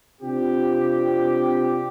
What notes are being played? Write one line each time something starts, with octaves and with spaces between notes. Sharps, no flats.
C3 C4 D4 F4 G4